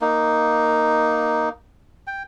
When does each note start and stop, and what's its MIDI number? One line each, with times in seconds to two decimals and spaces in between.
0.01 1.49 58
0.01 1.49 63
2.07 2.23 79